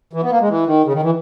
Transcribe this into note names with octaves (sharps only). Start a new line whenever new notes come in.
E3
B3
A#3
G#3
E3
D#3
C#3
D#3
E3